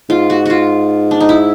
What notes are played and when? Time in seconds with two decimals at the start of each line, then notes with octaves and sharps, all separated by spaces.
0.09 G#2 F4
0.30 F#4
0.46 F4 F#4
1.11 D4
1.20 D#4
1.29 E4